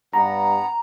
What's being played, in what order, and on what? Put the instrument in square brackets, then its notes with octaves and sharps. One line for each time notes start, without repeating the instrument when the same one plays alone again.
[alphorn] G2 [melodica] B3 [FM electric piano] A#5